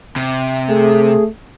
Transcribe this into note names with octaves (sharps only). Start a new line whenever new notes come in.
C3
A3 G#4